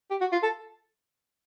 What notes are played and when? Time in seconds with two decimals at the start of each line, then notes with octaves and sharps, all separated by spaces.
0.10 G4
0.21 F#4
0.32 F4
0.43 A4